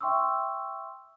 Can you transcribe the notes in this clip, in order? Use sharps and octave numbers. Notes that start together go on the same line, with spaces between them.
E5 G5 C6 C#6 D#6 E6